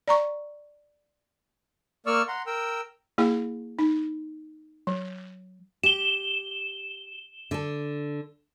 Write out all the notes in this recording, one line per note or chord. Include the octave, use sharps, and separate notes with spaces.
D5 A#5 C#6
A#3 D5 C#6 E6 F6
F#5 A#5 C6
A#4 G5 E6
A#3 E4 G#4 G5
D#4
F#3
G4 E7 G7
D3 A4